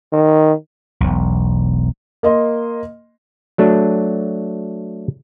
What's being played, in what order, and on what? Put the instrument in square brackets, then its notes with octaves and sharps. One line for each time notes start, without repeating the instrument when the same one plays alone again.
[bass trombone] D#3
[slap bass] E1 B1
[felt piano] A#3 D#5 C6
[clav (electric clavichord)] F#3 A3 D4